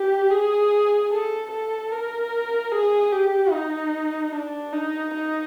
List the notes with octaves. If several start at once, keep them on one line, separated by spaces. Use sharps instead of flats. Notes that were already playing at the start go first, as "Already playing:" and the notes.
Already playing: G4
G#4
A4
A4
A#4
G#4
G4
D#4
D4
D#4
D#4